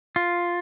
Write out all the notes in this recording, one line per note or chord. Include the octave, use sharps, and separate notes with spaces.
F4